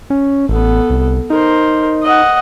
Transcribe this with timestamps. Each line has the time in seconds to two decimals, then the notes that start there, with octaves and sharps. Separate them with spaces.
0.10 C#4
0.49 A1 B3 A4
0.90 C2
1.30 D#4 A#4 C5
2.03 D#5 F#5